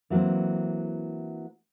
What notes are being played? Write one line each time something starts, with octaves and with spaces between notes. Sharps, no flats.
E3 F#3 G3 A#3 C4